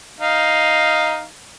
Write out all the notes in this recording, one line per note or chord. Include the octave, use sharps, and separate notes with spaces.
D#4 F5